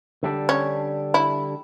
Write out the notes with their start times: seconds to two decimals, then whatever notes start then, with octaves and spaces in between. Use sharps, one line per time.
0.23 D3 G3 D4
0.49 C#4
1.14 E4